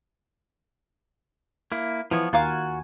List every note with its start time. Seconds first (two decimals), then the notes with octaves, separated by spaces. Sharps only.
1.72 A#3 E4
2.11 E3 F3 B3 C#5
2.33 D#2 F4 F#4 A#4 F5 G#5